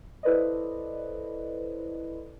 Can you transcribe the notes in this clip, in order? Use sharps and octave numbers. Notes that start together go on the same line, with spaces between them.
E4 A4 B4 C5 D5 D#5